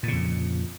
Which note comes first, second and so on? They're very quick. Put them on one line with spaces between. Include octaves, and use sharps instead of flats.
A#2 C#3 F2